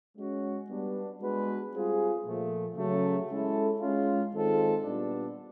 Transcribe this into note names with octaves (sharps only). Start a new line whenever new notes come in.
G#3 C#4 F#4
G3 B3 D4
G#3 B3 D4 F#4 B4
G3 C4 F4 G#4
A#2 F3 A3
C#3 F#3 A3
G#3 C#4 E4 A4
G#3 C#4 F4
D#3 G#3 C4 F4 A4
A#2 G3 B3 D4